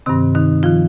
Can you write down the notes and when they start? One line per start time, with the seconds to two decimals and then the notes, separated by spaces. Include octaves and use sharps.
0.06 G2 C3 D#3 C4
0.35 D#3 D#4
0.63 D#3 F3 F4